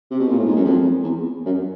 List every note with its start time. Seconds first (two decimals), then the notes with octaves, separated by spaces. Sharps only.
0.11 C3
0.20 B2
0.29 A#2
0.38 A2
0.46 G#2
0.56 F#2
0.65 F2
1.03 E2
1.46 F#2